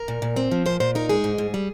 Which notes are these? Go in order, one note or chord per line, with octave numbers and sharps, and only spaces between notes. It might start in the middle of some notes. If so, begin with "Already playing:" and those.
Already playing: A#4
A#2
A#2
C4
F3
A#2 C5
A#2 C5
D#4 A#4
G#3 G#4
G#2
G#2
G3